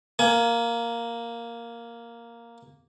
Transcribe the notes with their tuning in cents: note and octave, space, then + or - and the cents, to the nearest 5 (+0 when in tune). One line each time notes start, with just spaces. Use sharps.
A#3 +0 G#5 +25